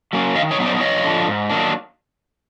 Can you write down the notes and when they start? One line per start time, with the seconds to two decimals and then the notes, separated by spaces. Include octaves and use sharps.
0.13 F#3 A#3 C#4
0.35 D#3 D#5 F5
0.51 C#5 D#5
0.58 F#3 B3 D#4
0.66 C5 D5
0.80 F2 C#5 D#5
1.04 D3 F3
1.27 G#2
1.49 D#3 F#3 A#3 D4